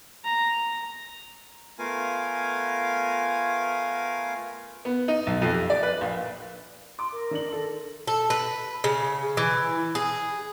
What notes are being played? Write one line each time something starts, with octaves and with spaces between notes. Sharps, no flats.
A#5
A3 B3 F4 A#4 F5 G#5
B3
D#4
B1
F2
G4
D5
B4
A#1
C6 D6
A#4
D#3 D4 F#7
A4
A4
B4
C#3
E3
G#4